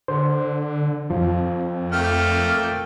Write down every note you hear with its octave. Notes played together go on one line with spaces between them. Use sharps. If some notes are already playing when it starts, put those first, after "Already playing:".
D3 C5
F2 F3
A3 A#3 G5 F6